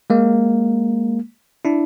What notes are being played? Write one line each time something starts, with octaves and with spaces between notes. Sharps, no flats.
G#3 A#3
D4 E4